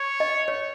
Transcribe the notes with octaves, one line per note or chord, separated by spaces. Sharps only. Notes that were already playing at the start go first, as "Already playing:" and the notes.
Already playing: C#5
D#5
C#5